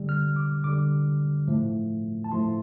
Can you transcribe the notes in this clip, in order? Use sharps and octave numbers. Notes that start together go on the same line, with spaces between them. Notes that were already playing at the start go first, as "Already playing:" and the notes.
Already playing: D3 G3
F6
D6
D3 G3 D6
A2 F3 A3
A5
A2 F3 A3 C6